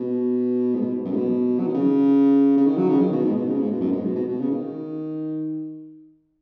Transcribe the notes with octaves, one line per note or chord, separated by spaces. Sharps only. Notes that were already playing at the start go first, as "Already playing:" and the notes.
Already playing: B2
G#2
B2
F#2
G#2
B2
F#3
D#3
C#3
C#3
D#3
F#3
C#3
D#3
B2
G#2
B2
C#3
G#2
B2
F#2
G#2
B2
B2
B2
C#3
D#3